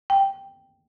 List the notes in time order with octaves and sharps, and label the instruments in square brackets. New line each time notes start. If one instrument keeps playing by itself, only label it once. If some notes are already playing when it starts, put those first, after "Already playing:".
[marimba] G5